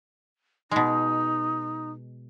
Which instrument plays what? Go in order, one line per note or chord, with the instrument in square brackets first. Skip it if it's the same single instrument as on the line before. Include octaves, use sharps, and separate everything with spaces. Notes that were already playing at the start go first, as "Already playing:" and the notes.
[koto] B2 G#3 [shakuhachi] D#4